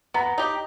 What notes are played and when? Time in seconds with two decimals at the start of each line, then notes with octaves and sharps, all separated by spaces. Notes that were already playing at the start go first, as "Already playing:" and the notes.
0.14 B3 A#5
0.38 D#4 G4